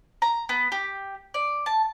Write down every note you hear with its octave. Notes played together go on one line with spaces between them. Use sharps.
A#5
B3
G4
D5
A5